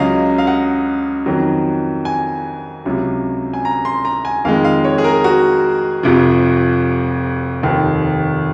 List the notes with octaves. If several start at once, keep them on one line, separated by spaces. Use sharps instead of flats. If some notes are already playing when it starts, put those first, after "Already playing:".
Already playing: C#2 C#3 F#3 D#5 F5
F5
F#5
F2 D#3 F#3
G#5
C#2 C3 F#3
G#5
A#5
C6
A#5
G#5
F2 D#3 G#3 F5
F5
C#5
G#4
A#4
F#4
F1 F2 C3 F3
F1 D#2 D#3